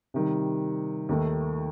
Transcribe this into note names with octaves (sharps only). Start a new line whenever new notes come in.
C3 D#3 G3
D#2 D#3 A3